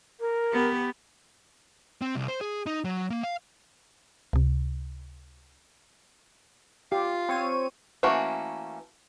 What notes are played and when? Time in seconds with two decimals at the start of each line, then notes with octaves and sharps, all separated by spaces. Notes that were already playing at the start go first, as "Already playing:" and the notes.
0.20 A#4
0.53 B3 G4
2.02 C4
2.15 C2
2.28 C5
2.41 G#4
2.66 D#4
2.85 F#3
3.10 A#3
3.23 F5
4.33 C#2 C3
6.92 F4 G4 F5
7.29 C4 C#5 D#7
8.03 E3 A3 A#3 C#4 F#4